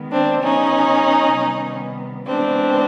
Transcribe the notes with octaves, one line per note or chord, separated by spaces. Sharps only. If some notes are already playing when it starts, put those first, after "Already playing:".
Already playing: D#3 G#3 B3
C4 D4
C#3 F#3 B3 C#4 D#4
C3 D#3 G3 B3
C#3 E3 G#3 B3 C4 D4